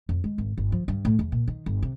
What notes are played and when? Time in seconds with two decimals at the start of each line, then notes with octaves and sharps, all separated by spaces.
0.09 F2
0.24 G#3
0.38 G#1
0.58 G1
0.72 F3
0.88 G2
1.05 A2
1.19 E2
1.32 A#2
1.48 D#3
1.66 G1
1.82 C3